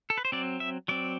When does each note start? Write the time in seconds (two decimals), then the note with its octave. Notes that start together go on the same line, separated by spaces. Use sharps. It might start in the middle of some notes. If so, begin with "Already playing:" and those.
0.10 A4
0.18 B4
0.25 C5
0.32 F#3 C4 D5
0.60 E5
0.88 F#3 C4 D5